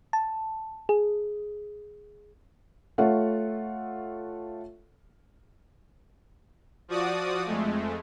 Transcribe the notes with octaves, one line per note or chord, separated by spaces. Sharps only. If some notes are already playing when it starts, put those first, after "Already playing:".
A5
G#4
A3 F4 A4 C#5 E5 F#5
F3 F#4 D5 D#6
F2 G#3 A3